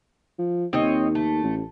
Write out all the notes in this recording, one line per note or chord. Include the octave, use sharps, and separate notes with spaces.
F3
D#2 C4 C#5 D#5
A3
A1